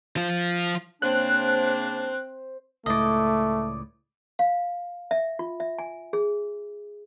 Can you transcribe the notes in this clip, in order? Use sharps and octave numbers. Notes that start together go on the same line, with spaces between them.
F3 F4
C#3 A#3 C4 D4 C5 F#6
C#2 A2 A3 D5 D#5
F5
E5
F4
E5
G#5
G#4